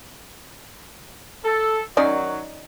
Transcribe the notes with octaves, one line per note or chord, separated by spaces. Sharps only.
A4
D#3 F#3 C#4 D#4 D5